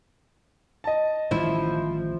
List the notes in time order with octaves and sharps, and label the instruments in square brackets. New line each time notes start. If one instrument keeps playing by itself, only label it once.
[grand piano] D#5 A5
[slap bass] A1 D#3 G3 [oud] F3 E4